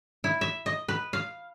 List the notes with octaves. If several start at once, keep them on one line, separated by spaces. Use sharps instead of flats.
E4
E5
D#5
B4
F5